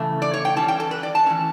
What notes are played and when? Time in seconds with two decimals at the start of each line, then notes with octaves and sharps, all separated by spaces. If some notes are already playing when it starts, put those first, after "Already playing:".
Already playing: C#3 E3 A3
0.22 D5
0.34 C#5
0.45 G5
0.56 E3 G3 C#4 A5
0.68 G5
0.80 A4
0.91 B4
1.03 D5
1.15 A5
1.26 E3 A3 C#4